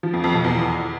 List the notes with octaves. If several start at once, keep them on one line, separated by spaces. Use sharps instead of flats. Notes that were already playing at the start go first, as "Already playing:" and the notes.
F3
F2
F2
B2
E2